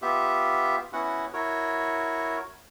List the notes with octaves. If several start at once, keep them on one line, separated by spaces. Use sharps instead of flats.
B3 F4 G4 E5
B3 C#4 E4 F#4 F#5
E4 F#4 A#4 C#5